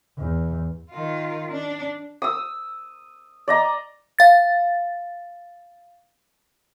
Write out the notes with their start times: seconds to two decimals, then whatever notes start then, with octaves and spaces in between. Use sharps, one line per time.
0.17 E2
0.91 D#3 F4
1.51 D4
2.22 D#6 E6
3.48 D5 D#5 A#5
4.19 F5 A6